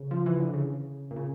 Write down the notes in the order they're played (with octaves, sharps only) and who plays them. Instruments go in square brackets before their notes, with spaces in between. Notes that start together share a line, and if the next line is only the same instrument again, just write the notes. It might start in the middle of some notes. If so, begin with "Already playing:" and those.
Already playing: [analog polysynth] C#3
F3
E3
D3
C#3
A#2
C#3